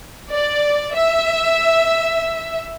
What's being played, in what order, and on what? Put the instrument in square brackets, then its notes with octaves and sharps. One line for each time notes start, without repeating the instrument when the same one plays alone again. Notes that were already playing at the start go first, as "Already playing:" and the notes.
[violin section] D5
E5